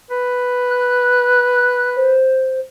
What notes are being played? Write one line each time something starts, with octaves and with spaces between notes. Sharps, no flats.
B4
F#6
C5